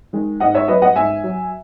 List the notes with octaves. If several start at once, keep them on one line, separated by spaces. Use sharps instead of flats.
D#3 G#3
G#2 D#5 F#5
C#5 E5
F#3 B4 D#5
D#5 F#5
G#2 E5 G#5
F#3